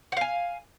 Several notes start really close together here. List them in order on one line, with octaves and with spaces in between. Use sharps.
F#5 F5 G#5